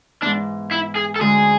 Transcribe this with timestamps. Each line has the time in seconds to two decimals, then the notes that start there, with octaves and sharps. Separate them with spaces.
0.21 G#2 E3 B3 D4
0.71 E4
0.95 G#4
1.16 A4
1.20 D2 D3 G#3 C#4 G#4